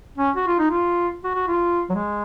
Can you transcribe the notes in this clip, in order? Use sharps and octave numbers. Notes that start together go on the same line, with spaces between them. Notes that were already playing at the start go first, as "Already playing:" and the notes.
C#4
F#4
F4
D#4
F4
F#4
F#4
F4
F#3
G#3